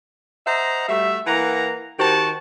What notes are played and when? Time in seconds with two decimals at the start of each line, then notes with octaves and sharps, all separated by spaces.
0.46 C5 D#5 E5 F#5 A#5
0.89 G3 A3 F#4 E5
1.27 E3 A#3 F#5 A#5
1.99 D#3 F#4 G4 C5 A5